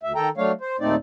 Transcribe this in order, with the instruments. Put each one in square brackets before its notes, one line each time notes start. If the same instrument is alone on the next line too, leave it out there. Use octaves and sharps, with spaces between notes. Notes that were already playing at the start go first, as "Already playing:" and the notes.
[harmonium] D2 E5
D#3 A4 G5 A#5
F#3 A3 D4 C#5 F5
C5
D#2 A#2 A3 C4 D#4 D5